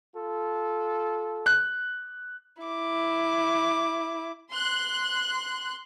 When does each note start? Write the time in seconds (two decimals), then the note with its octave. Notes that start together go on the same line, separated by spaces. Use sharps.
0.15 F4 A4
1.46 F#6
2.62 E4 D6
4.51 C6 F#6